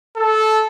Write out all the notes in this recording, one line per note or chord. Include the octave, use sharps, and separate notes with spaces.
A4